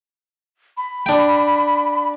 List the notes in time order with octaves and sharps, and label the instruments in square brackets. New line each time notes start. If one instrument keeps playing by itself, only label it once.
[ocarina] B5
[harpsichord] D4 G5